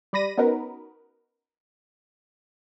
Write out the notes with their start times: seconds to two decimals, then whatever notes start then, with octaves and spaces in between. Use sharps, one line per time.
0.13 G3 D5 B5 A#6 D#7
0.37 B3 C#4 D#4 F#4 A#4 B4